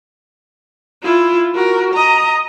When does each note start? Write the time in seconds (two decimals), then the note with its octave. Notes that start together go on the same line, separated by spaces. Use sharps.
1.02 E4 F4
1.55 F#4 A#4
1.94 D#5 A#5